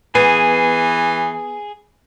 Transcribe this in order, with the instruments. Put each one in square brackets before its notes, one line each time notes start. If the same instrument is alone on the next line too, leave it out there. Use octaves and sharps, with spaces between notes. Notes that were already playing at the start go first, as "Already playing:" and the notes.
[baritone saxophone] E3 [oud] B3 [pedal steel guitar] G#4